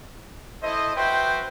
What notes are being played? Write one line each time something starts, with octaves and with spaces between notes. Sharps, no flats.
E4 A4 C5 D#5
F#4 B4 C5 E5 G5